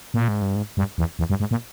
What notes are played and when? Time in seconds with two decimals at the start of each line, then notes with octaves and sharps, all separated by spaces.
0.14 A#2
0.28 G#2
0.42 G2
0.56 G#2
0.77 G2
0.98 E2
1.19 E2
1.30 G2
1.40 G#2
1.51 A#2